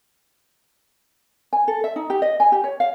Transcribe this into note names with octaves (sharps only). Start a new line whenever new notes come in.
G#5
A4
E5
D#4
G4
D#5
G#5
G4
C#5
F5